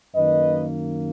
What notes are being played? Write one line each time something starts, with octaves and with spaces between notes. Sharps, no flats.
F#2 D#3 A#3 B4 D#5